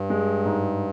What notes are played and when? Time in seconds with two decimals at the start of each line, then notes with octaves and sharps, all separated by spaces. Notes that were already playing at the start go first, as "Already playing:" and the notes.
Already playing: G2
0.10 G#3
0.45 G#2